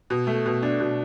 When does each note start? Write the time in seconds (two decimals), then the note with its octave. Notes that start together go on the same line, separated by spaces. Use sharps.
0.10 B2
0.27 A3
0.46 B2
0.63 D4
0.80 B2